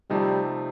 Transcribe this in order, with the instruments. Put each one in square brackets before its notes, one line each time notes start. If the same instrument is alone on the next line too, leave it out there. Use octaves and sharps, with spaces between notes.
[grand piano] C3 F3 A3 D#4 [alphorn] G3